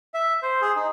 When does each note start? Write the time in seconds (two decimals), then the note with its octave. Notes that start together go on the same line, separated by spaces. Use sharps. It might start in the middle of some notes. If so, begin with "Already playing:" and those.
0.14 E5
0.42 C5
0.61 G#4
0.76 D#4